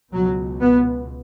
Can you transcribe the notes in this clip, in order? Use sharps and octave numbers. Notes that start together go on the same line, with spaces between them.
C#2 B2 F#3
B3